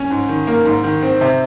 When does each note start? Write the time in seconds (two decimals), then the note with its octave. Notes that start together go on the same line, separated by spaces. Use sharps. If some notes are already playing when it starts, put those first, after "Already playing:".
Already playing: C#4
0.10 G#2
0.28 D#3
0.47 A#3
0.65 G#2
0.84 D#3
1.03 C4
1.21 C3